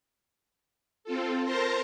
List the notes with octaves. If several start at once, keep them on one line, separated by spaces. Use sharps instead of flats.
C4 F4 A4
A#4 C5 A5 A#5 C6